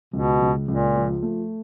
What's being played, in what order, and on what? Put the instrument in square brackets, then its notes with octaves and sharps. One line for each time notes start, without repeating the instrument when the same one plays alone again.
[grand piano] C#2 [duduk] B2
[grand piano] C#2
[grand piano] C#2 [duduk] A#2
[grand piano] F3
A3